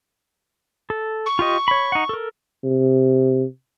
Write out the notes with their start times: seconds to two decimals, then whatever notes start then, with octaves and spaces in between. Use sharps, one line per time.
0.90 A4
1.26 C#6
1.39 F4 G4 D#5
1.68 C#5 B5
1.92 D#4 F#5
2.09 A4 A#4
2.64 C3